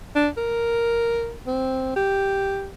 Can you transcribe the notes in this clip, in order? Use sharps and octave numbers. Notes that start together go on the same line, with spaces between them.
D4
A#4
C4
G4